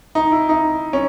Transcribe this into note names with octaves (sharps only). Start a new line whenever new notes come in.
D#4
E4
D#4
C#4